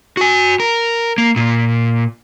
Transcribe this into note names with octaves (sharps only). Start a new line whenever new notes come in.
F#4 G#5
A#4
A#3
A#2